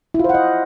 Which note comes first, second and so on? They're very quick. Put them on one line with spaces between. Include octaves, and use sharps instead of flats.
E4 F4 C5 F#5 D#5